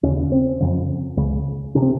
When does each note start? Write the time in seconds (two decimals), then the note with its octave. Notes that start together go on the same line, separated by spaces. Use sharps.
0.03 D#2 C#3 C#4
0.32 C4
0.60 F2 C#3
1.17 C#2 C#3
1.75 C3 C#4
1.82 C4